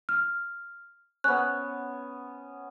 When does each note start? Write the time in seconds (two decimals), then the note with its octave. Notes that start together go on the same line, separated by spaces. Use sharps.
0.09 F6
1.24 B3 C#4 F#6